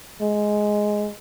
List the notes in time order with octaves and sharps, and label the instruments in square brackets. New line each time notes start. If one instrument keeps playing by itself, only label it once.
[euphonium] G#3